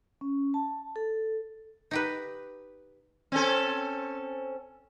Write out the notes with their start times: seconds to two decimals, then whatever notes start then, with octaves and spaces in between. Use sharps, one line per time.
0.21 C#4
0.54 A5
0.96 A4
1.91 D#4 G4 B4
3.32 C4 C#4 A4